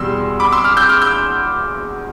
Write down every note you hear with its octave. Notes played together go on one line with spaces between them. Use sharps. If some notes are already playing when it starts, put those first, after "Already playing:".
Already playing: E2 B2 G3 C6 E6
B5 D6
C6 E6
D6 F6
E6 G6
D6 F6
E6 G6